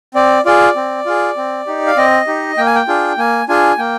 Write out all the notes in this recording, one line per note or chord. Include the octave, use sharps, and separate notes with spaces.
C4 D5
F4 G#4 D5
C4
F4 G#4
C4
D#4 G4
F5
C4 D#5
D#4 G4
A#3 G5
G#5
G5
D4 F4 G#4
A#3 G#5
D4 F4 G#4 G#5
A#3 G5